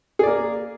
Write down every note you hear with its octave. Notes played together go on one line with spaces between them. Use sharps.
A#3 G#4 D5